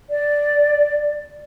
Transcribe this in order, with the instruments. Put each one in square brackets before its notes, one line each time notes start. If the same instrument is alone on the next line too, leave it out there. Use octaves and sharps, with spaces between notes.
[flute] D5